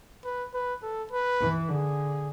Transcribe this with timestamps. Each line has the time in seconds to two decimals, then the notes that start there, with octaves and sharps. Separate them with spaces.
0.25 B4
0.54 B4
0.83 A4
1.11 B4
1.41 E3
1.69 D3 G#4